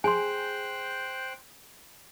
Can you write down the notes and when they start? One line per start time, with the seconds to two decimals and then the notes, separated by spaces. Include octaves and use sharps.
0.04 G#4 C5 G5 G#5 C6 F#6